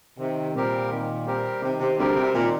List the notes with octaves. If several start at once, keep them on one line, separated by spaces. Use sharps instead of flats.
C3 D#3
A#2 G3 C4 G4 A#4
D#3
G3 C4 G4 A#4
C3 D#3
C3
D2 D3 G3 C4 G4 A#4
C3
A#2 D#3